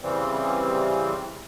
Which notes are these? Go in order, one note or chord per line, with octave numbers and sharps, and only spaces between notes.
C#3 E3 G3 C4